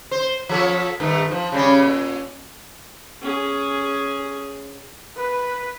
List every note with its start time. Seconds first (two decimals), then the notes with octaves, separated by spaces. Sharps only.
0.11 C5
0.49 F3 A4 C#5
1.00 G2 D#3 A3
1.31 F3
1.52 C#3 G3 C#4
1.83 A#2
3.22 C#4 G#4
5.17 B4